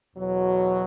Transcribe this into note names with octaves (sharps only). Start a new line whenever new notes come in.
E2 B2 F#3